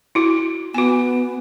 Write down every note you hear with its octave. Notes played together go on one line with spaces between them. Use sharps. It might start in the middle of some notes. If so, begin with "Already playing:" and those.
E4 F#4
B3 F#4 G#5